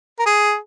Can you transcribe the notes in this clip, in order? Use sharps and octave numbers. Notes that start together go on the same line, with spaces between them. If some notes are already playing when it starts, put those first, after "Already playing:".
A#4
G#4